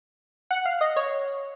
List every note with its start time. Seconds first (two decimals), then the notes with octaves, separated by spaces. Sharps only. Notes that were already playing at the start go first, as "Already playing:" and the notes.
0.51 F#5
0.66 F5
0.81 D#5
0.96 C#5